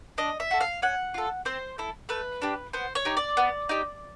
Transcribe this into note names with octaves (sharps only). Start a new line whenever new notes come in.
D4 D#5
E5
F#4 A4
F5
C#4 F#5
F4 A4
C4 C5
E4 A4
A3 B4
D4 G4
B3 C5
C#5
D#4 G4
D5
B3
D#4 G4